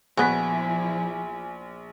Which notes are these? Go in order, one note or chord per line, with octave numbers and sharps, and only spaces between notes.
A#1 F3 B3 E4 F#4 G#5 B6